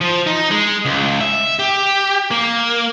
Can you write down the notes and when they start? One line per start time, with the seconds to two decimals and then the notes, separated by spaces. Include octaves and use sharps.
0.01 F3
0.27 D#4
0.51 G#3
0.85 C#2
1.21 E5
1.59 G4
2.31 A#3